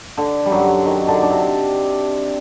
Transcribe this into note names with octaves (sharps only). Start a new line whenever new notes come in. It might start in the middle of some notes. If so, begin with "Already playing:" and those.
D3
G3
F#2 F#3
D#3
D3 D4
D4
C3 C4